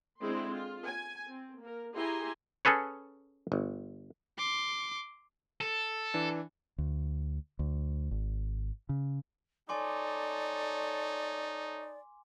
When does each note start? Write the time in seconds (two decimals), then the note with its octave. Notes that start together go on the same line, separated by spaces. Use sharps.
0.20 D3 G#3 C4 E4 C6
0.51 F4
0.85 G#5
1.27 C4
1.60 A#3 A#4
1.94 E4 G4 G#4 G#5 A#5 C6
2.65 C#4 G#4 A4 B4 C#5
3.52 G1
4.38 C6 D6
5.61 A4
6.14 E3 D4
6.78 D2
7.59 D2
8.11 G#1
8.89 C#3
9.69 D#4 A4 C#5 D5 G#5 C6 D6